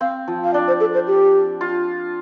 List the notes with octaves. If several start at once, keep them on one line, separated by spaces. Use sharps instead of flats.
C4 F5
F3
F5
D4 D5
C5
A4
C5
G4
F4